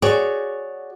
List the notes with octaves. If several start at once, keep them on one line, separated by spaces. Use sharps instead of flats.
F#4 G#4 C#5 D5